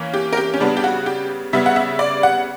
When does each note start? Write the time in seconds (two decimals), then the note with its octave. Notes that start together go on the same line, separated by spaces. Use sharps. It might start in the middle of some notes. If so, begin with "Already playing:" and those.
Already playing: E3 A#3 C#4
0.14 G4
0.33 A#4
0.37 G4
0.54 C#4
0.60 C#3 G3 B3 D4
0.77 G4
0.84 F#4
1.06 G4
1.53 C#3 G3 B3 E5
1.66 F#5
1.76 E5
1.99 D5
2.23 F#5